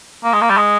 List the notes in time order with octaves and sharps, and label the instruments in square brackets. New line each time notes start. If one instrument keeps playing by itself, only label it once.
[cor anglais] A#3
G#3
A#3
G3
G#3